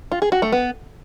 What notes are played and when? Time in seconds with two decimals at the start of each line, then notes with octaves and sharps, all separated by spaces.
0.12 F4
0.22 G#4
0.32 F#4
0.42 A3
0.52 B3